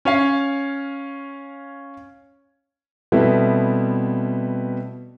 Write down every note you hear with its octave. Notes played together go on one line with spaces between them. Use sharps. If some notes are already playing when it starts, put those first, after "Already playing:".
C#4 C#5 F5
B2 G3 A3 B3 C4 E4